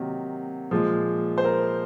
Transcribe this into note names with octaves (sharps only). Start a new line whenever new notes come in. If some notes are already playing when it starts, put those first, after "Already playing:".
Already playing: C3 D#3 F#3 A#3
A#2 F3 G#3
C5
A#4